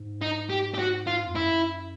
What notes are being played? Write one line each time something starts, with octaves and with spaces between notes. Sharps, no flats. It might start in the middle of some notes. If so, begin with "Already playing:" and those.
Already playing: G#2
D#4
G4
G4
F#4
F4
F2
F#2 E4